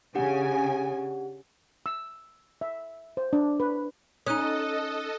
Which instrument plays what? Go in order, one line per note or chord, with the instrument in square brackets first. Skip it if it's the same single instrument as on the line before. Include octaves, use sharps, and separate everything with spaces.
[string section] C#3 G#5 [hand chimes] D4 G4 F#5
[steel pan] E6
E5
C5
D4
B4
[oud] C#4 D#4 [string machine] A4 D#5 [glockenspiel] D#6 F#6 D#7